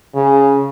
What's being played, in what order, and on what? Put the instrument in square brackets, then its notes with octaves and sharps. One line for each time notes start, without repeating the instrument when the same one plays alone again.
[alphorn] C#3